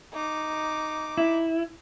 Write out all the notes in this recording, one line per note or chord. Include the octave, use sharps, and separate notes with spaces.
D#4 D6
E4